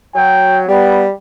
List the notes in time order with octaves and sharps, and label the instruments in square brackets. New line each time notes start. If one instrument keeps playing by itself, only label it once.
[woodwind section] F#3 [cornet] G5
[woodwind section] G3 [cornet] B3